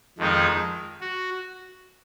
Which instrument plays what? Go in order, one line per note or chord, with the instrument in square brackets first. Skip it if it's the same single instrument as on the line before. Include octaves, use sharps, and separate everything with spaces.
[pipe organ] F2 D#3 G#3 D#4
F#4